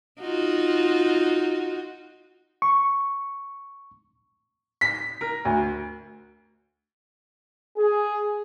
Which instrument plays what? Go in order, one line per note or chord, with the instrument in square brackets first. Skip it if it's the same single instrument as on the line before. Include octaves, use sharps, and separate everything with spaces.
[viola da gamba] D#4 F4 F#4
[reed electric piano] C#6
[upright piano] B6
A#4
D2
[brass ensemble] G#4